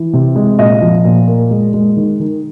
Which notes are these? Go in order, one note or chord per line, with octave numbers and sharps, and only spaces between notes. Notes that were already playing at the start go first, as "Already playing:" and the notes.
Already playing: E3
C3
G#3
A#2 D#5
F3
A#2
A#3
G#3
G#3
D#3
D#3